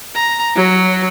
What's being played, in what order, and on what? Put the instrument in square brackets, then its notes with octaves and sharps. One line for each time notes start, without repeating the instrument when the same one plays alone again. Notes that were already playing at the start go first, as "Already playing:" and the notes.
[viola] A#5
F#3